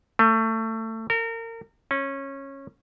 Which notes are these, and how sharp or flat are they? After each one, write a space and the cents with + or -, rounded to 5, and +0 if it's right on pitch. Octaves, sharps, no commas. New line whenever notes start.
A3 +25
A#4 -30
C#4 -20